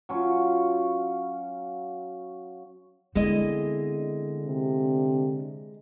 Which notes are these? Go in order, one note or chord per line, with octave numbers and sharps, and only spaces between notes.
F#3 C#4 F4
D3 G#3 B3 C4 E4 D#5
C3